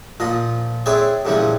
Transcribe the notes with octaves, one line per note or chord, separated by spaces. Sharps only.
A#2 F3 F4 D#5
C4 E4 G#4 B4 C#5 D5
G2 A#2 C#3 E3 F3 G3